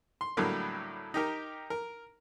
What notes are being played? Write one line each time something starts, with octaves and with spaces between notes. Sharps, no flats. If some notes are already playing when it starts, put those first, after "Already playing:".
C6
A2 D3 F#3 G3 A#3
D#4 G4 A#4
A#4